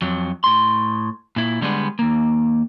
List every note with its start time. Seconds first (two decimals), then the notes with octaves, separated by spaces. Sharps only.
0.02 F2 F#3
0.44 A2 C6
1.36 A#2 E4
1.61 D3 G3 G#3 B3 D4
1.99 D#2 A#3